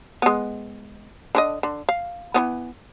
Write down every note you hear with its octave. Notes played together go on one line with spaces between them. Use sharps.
G#3 B3
D3 D4 D#5
D3
F5
E3 F3 B3